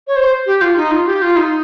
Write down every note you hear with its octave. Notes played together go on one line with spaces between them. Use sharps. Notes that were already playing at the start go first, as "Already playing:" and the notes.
C#5
C5
G4
F4
D#4
F4
G4
F4
D#4